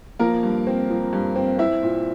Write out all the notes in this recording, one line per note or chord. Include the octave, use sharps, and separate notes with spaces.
F3 A#3 A#4
G2
C4
F3
G2
C4
C4 E4 E5
A#2